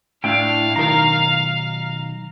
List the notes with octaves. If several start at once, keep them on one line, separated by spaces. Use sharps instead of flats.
A2 D4 E4 F5 G5
B1 D#3 A#4 A#5